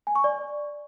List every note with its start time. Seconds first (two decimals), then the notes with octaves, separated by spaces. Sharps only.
0.07 G#5
0.16 C#6
0.24 D5